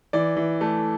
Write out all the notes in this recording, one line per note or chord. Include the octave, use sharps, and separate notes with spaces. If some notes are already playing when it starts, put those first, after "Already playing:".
E3 D5
E3
A3